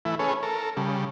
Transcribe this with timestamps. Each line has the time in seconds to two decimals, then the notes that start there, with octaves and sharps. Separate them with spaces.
0.05 E3 A3 E4
0.19 C#4 G#4 A4 B4 C#5
0.43 A4 A#4
0.77 C#3 G3